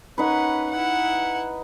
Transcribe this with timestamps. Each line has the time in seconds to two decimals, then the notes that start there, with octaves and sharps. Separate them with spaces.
0.18 C#4 D#4 B4 F#5
0.71 E4 F#5